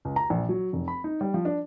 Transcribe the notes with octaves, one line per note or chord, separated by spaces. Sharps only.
C#2
A#5
A#1
F#3
F1
B5
D#4
G3
F3
D4